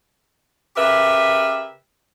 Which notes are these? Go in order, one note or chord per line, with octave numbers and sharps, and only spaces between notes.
C#3 G4 A#4 B4 E5